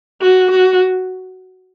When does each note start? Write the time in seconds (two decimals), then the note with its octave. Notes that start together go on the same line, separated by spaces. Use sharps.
0.21 F#4
0.51 F#4